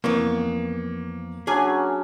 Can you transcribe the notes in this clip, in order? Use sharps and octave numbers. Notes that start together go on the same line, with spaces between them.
F2 E3 A#3 B3 C#6
F#3 C#4 D4 G#4 G#5